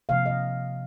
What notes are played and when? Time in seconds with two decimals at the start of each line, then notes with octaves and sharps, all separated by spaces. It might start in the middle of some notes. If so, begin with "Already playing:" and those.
0.09 C3 F3 A#3 F5
0.26 D#5